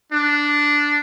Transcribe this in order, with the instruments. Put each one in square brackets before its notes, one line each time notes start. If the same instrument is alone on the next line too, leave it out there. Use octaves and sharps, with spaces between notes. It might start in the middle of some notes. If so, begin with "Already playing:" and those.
[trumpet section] D4